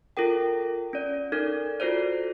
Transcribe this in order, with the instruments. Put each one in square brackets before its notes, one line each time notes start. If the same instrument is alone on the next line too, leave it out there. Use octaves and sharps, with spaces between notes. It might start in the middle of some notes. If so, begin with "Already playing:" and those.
[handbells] F4 A4 A#4 G5
C#4 D5
D#4 A4 A#4 D5
F4 F#4 A4 C5 D5